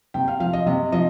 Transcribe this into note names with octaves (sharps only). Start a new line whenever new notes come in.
C3 G5
F5
F3 F5
D#5
C3 D#5
F3 D#5